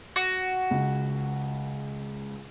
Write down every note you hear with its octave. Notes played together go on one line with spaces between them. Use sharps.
F#4
C#2